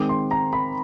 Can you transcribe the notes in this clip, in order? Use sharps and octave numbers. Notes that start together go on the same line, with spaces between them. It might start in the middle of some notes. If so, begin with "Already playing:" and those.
Already playing: D#3 G#3 C4 D6
C6
A#5
B5